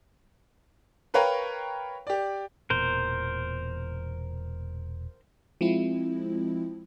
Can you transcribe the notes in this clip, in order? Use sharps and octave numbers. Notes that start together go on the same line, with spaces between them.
A#4 B4 C#5 F5 G5 A#5
G4 D5
E1 E2 A#2 A#4 C5
F3 G#3 C4 E4